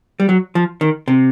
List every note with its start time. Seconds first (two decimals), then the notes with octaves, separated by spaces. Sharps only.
0.20 G3
0.29 F#3
0.55 F3
0.81 D#3
1.08 C3